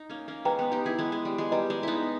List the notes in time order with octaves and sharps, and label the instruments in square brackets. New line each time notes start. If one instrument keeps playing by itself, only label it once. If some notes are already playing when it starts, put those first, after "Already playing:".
Already playing: [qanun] D#4
A#3 C#4
A#3 C#4
[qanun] G#3 B3 [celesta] B4 G5 A#5
[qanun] B3 D#4
D#4 G4
E4 G#4
G#3 B3
G#3
G3
G#3
[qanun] G3 [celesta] B4 D#5 A#5
[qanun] G#3
B3 D#4 E4